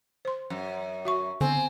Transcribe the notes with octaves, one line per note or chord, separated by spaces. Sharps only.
C5 C6
F#2
F#4 E5 C#6
D3 B3 C4 G#5